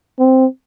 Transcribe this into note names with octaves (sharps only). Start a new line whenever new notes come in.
C4